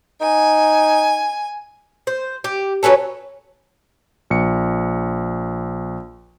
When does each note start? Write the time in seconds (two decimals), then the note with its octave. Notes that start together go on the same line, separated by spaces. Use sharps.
0.21 D#4 G#5
2.07 C5
2.44 G4
2.83 F#3 B3 C#4 A4
4.30 A#1 C#7